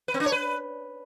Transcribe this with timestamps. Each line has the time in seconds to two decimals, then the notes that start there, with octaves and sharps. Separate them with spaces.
0.08 B4
0.14 C4
0.20 D4
0.26 C#5
0.32 B4